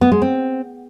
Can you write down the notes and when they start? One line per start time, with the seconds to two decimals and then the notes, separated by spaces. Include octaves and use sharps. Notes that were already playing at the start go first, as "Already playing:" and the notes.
0.01 B3
0.12 G#3
0.22 C4